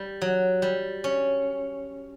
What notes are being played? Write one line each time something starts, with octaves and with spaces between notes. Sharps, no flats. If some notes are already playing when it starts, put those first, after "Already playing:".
Already playing: G3
F#3
G3
C#4